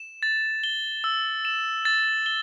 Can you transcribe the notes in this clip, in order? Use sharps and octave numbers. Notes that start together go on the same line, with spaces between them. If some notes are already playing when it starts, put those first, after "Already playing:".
Already playing: E7
A6
G7
E6
E7
A6
G7